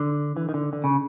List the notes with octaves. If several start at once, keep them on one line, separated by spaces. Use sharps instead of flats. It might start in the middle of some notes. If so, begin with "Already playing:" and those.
Already playing: D3
E3
D#3
D3
D3
C#3